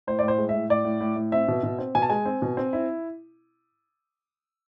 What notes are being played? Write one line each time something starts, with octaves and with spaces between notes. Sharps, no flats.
A2 C5
A2 D5
C5
G#3
A2 E5
A2 D5
A2
A2
A2
C4 E5
B2
B2
C4
B2 G#5
A5
G#3 G#5
C4
B2
C4
E4